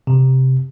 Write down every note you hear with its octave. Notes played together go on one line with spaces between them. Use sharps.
C3